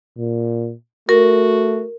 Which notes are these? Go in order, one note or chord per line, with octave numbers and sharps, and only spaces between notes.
A#2
A3 F#4 A#4